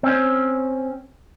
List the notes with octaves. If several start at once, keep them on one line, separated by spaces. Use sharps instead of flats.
C4 C#4